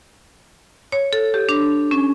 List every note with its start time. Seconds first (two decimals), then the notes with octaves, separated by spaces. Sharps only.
0.92 C#5
1.13 A4
1.34 G4
1.49 D4
1.91 C#4